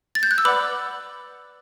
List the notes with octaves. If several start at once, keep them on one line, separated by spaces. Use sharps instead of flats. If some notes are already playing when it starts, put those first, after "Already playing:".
A6
G6
F#6
E6
B4 D5 F#5 B5 D6